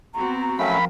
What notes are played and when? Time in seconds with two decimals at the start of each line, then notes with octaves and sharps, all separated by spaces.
0.14 B3 C4 F#4 A#5
0.59 F3 F#3 A3 C#4 A#4 F5 G5 B5